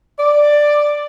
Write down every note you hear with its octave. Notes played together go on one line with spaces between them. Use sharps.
D5